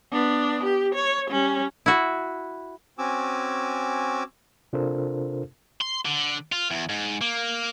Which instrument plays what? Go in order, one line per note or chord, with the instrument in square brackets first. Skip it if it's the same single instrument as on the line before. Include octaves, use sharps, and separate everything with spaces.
[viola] B3 D4
G4
C#5
G3 C#4
[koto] E4 F#4
[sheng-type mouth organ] C4 C#4 F#4 G#5 D6 E6
[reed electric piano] C3 D4 F4 A4 A#4 C5
[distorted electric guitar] C6
D3
F4
E2
G#2
A#3